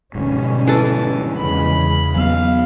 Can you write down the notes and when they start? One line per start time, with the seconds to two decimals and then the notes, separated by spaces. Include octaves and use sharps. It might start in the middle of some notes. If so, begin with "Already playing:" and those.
0.15 D2 G#2 B2 G3 C#4
0.67 E3 A4
1.38 E2 C#3 G#3 B5
2.16 F#3 B3 F5